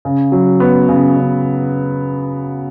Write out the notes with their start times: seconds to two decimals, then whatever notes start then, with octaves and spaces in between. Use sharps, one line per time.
0.05 C#3
0.32 F#3
0.60 B3
0.89 C#3
1.17 C#3